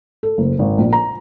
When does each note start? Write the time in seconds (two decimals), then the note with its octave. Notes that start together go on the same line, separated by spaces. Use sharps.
0.23 A4
0.38 F#1
0.59 G#1
0.78 A#1
0.93 A#5